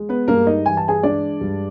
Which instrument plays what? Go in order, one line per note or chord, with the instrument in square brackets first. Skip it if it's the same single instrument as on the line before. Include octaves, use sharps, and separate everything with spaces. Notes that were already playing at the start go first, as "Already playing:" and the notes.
Already playing: [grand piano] G#3
B3 B4
G2 A#3 A#4
D#4 D#5
E3 G#5
A5
G#4 G#5
G#3 D4 D5
G2